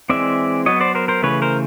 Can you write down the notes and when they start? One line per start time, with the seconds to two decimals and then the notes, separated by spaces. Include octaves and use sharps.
0.10 E3 G#3 C4 D5 E5
0.66 F#3 B3 C#5 D#5
0.80 C5 D5
0.95 A#4 C5
1.08 A#4 C5
1.22 C#3 E3 A3 B4 C#5
1.42 A#4 C5